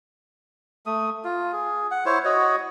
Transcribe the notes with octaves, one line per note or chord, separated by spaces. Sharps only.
A3 D#6
F4
G#4
F#5
E4 C5 C#5
F#4 C#5 D#5